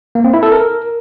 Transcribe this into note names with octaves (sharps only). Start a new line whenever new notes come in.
A#3
C4
E4
A4
A#4